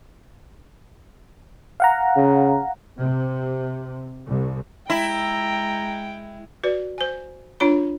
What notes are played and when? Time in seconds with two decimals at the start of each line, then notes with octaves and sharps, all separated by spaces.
1.80 F5 F#5 A#5
2.16 C#3
2.99 C3
4.27 C2
4.90 G#3 E4 G5 A#5
6.63 F#4 B4 D5
6.98 C5 G#5
7.60 D4 F4 C#5 B5